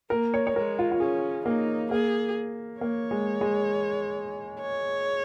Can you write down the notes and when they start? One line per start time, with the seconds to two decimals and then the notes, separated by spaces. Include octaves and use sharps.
0.10 A#3 A#4
0.34 C#5
0.47 C#5
0.56 G#3 A#4
0.79 F4
0.92 F4
1.00 C#4 G#4
1.46 A#3 D#4
1.91 A#3 G#4
2.81 A#3 C#5
3.11 G#3
3.41 G#3
4.61 C#5